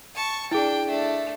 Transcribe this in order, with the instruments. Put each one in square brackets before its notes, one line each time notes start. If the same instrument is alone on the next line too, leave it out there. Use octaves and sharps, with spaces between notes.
[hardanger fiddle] A5 C#6
[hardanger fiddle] D4 G5 [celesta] E4 G#4
[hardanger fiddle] A3 D4